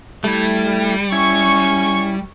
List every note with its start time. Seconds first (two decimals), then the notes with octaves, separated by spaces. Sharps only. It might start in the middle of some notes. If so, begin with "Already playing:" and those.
0.24 G3 A3 E4
1.12 C#4 E4 C#6